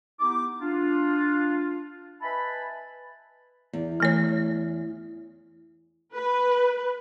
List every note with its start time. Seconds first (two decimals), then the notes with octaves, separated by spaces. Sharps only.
0.20 B3 D#4 E4 G4 D6
0.60 D4 F4
2.22 B4 D#5 E5 G#5 A5 B5
3.73 E2
4.00 E3 A3 C#5
6.14 B4